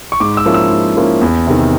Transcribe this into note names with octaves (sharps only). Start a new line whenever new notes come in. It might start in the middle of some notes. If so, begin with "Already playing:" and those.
C#6
G#2 D6
E6
F3 A#3 C#4 E4
E6
G#2
F3 A#3 C#4 E4
E2
C3 D#3